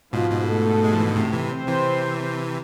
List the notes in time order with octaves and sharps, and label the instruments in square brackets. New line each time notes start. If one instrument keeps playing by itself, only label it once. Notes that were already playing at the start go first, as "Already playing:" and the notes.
[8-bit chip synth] G#2 B2 [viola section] F3 F4
[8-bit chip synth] G#2 B2
[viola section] A3 A4
[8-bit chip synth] G#3
F3
E3
D3
A2 C3
C3 E3
[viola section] C4 C5
[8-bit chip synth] C3 E3